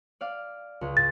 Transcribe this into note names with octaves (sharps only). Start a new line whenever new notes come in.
D5 F5
C#2
A6